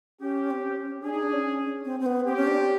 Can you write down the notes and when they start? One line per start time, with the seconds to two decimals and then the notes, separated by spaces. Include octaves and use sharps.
0.20 C#4 G4
0.51 C4
0.61 C#4
1.02 D4 G#4
1.13 D#4
1.23 D4
1.33 C#4
1.85 C4
2.00 C4
2.06 B3
2.26 C4 G4
2.37 C#4
2.47 D4
2.57 C4